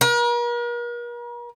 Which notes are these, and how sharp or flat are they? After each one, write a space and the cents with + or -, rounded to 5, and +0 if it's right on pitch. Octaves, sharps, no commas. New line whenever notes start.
A#4 +45